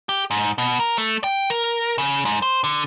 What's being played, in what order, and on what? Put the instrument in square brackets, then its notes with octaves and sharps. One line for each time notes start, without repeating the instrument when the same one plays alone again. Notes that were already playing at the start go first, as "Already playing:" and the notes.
[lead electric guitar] G4
G#2
B2
A#4
A3
G5
A#4
C#3
G#2
C5
D3